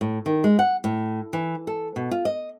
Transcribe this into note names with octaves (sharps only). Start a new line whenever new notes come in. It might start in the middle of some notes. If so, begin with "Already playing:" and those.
A2
D#3
G#3
F#5
A2
E3
A4
B2
F4
D#5